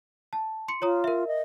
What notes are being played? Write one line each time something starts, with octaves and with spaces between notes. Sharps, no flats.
A5
C6 C#7
F4 C#5 A#5 D#6
A#4 E5
D#5